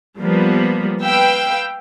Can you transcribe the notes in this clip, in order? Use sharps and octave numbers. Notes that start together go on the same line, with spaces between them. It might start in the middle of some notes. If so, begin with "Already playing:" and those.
F3 G3 A#3 B3
B4 F5 G5 E6